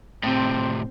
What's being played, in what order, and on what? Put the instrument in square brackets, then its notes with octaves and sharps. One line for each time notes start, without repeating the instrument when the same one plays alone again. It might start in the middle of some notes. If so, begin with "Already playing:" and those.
[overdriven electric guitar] A2 C3 [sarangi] C4